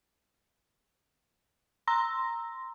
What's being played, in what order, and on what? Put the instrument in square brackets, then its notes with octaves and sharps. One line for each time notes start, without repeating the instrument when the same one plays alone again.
[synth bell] A#5 C6 E6 A#6